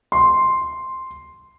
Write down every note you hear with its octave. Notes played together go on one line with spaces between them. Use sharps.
C6